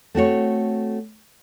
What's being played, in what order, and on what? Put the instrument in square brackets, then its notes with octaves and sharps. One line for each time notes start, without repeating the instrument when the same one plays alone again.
[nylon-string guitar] A3 C4 F#4 C#5